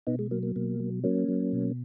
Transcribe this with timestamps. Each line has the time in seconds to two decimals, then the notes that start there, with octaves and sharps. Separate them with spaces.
0.07 B2 B3 D#4
0.19 G#3
0.31 F#3 A#3
0.43 A#3
0.56 B2 A#3
0.80 F#3
1.04 F#3 A#3 C#4
1.28 F#3
1.53 B2